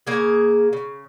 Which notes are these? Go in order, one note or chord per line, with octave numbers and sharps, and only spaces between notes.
C#3 A#3 G#4
C#3